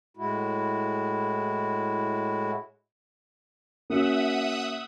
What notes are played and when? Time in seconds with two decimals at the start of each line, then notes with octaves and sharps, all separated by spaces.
0.17 A2 G#3 E4 F#4
3.90 A#3 C#4 F#4 E5 F#5 D#6